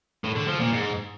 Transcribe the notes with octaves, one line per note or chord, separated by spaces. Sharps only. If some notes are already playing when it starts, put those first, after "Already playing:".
A2
D3
F3
A#2
G#2